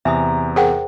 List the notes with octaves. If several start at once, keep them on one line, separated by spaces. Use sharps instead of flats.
E2 C3 E5 G#5 A#5 D#6
G#4 A#4 C5 F#5 G5